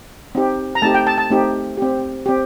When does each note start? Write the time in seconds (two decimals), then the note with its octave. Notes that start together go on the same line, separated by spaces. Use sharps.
0.35 C4 D#4 G4
0.75 A#5
0.82 A3 C4 D#4 G4 A5
0.94 G5
1.07 A5
1.18 A5
1.30 A3 C4 D#4 G4
1.78 C4 G4
2.26 C4 G4